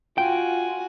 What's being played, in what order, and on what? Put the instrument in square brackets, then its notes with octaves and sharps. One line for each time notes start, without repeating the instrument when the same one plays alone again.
[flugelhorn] F4 [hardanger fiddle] F#4 G#5 [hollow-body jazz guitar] G5